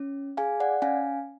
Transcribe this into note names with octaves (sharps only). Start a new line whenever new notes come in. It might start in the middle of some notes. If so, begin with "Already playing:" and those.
Already playing: C#4
G#4 F5 G#5
D5 F#5
C#4 F5 G#5